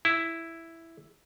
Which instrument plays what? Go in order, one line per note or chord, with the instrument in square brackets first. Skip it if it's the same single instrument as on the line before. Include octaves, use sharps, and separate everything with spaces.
[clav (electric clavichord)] E4